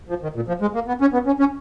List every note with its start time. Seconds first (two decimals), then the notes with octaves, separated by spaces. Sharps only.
0.09 F3
0.23 D#3
0.36 A#2
0.48 F3
0.61 G#3
0.75 A#3
0.88 B3
1.01 C#4
1.13 B3
1.27 C#4
1.40 C#4